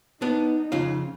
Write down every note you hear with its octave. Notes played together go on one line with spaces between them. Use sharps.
B3 D4 D#4
F2 C#3 F4